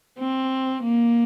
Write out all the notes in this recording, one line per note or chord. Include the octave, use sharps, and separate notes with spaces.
C4
A#3